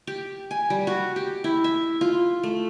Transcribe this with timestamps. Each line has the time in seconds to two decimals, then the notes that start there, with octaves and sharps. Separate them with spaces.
0.07 G4
0.51 G#5
0.70 G3
0.87 F#4
1.16 G4
1.44 E4
1.64 E5
2.01 F4
2.43 A3